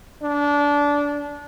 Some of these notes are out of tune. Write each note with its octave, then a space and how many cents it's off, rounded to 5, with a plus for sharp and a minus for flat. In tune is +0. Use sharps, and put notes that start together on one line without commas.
D4 -20